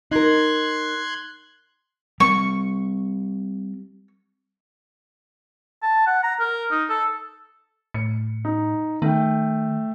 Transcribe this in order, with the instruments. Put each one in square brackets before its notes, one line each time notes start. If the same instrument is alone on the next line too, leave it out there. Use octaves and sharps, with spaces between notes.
[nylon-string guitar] D#4 A#4 [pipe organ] C6 F#6 G#6
[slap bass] G3 C4 [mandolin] C#6
[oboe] A5
F#5
A#5
A#4
D#4
A4
[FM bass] A2 [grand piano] C#7
[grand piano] D#4
[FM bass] D#3 [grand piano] A3 G5